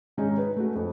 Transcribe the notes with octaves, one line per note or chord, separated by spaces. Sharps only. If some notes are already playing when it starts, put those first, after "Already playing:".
G#2 D#3 G#3 C#4 D#4
B4
A3 F#4
F2